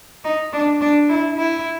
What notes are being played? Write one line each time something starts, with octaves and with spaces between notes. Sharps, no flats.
D#4
D4
D4
E4
E4